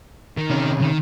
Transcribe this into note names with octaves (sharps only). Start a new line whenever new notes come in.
D#3
C3 C#4
D#3